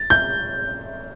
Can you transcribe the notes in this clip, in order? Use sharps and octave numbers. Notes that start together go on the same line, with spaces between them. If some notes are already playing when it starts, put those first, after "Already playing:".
Already playing: A6
G6